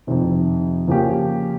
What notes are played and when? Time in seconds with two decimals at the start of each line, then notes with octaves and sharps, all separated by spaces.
0.07 F2 C3 D#3
0.87 C#3 F3 A#3 C#4 G4